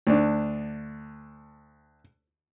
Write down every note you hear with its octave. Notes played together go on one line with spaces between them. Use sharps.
D2 D4